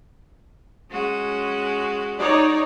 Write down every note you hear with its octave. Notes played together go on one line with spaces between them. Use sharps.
G#3 C#4 F#4
D#4 C#5 D5